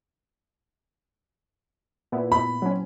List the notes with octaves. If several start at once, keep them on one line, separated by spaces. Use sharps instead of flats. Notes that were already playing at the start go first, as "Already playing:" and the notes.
A#2 B3 E4
B5
F#3 C4 C#4